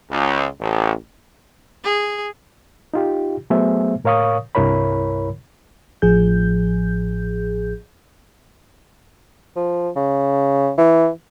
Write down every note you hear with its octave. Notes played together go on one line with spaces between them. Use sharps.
C#2
A1
G#4
D#4 F4 G4
F#3 A3 B3 G#4 C5 E5
A2 A#4 C#5 F5 C#6 D#6
C2 G2 E4 A#4 C#5 B5
A1 A2 F3 G#4 G6
F3
C#3
E3